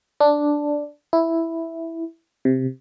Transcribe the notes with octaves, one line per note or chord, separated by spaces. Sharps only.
D4
E4
C3